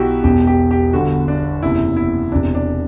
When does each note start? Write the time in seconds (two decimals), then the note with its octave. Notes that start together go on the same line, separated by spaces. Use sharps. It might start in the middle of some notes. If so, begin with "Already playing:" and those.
Already playing: B1 B2 E4 F#4 G4
0.24 E1 E2 B2 G4
0.47 G4
0.71 G4
0.93 G1 G2 D3 F#4
1.28 D4
1.62 F#1 E2 C3 E4
1.97 E4
2.32 E1 E2 C3 D4
2.55 D4